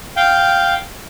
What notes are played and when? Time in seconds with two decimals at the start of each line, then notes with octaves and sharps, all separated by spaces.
0.16 F5 G5